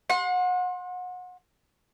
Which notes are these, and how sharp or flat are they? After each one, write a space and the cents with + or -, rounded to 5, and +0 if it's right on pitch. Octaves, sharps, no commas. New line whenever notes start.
F#5 -30 C6 +25